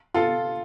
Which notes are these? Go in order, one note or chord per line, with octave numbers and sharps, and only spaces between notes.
F4 A4